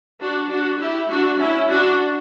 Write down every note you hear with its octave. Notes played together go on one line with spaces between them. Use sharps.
D4 F#4
D4 F#4
E4 G4
D4 F#4
C#4 E4
D4 F#4